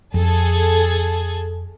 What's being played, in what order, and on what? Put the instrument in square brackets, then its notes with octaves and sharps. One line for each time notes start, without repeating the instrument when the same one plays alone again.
[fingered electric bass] F2 [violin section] G#4 A4 G#6